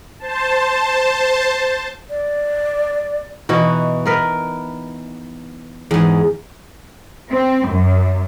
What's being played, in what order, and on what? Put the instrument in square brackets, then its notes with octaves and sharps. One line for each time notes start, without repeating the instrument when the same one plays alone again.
[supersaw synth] C5 A5
[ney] D5
[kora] B2 F#4 [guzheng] E3 D#4 E4
[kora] B3 A#4 B4
[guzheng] E2 G#2
[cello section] C4
F#2